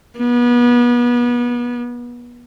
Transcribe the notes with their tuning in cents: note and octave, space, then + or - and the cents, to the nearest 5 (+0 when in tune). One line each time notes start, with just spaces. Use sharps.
B3 -30